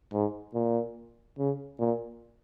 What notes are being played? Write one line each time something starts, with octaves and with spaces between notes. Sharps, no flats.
G#2
A#2
C#3
A#2